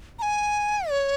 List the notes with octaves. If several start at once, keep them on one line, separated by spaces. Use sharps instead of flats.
A#5
G#5
C#5